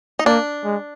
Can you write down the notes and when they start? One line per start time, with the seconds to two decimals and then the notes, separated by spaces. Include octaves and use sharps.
0.19 D#4
0.26 A#3 D4
0.65 G#3